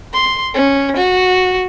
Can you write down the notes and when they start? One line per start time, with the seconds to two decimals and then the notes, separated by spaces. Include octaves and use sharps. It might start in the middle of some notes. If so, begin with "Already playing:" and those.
0.14 C6
0.54 C#4
0.96 F#4